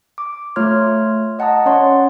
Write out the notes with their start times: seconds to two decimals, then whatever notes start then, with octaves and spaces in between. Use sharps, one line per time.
0.18 D6
0.56 A3 F4 C#5 C6 F6 G#6
1.39 D#5 F#5 A5 A#5 D#6
1.66 C#4 C#5 D5 F#5 C6